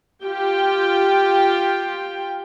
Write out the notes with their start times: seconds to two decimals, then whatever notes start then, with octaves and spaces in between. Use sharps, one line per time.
0.23 F4 G4 G5